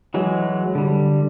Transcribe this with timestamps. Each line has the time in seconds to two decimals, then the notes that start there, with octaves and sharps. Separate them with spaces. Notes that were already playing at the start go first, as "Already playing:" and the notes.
0.14 E3 F#3 G#3
0.75 D3 G3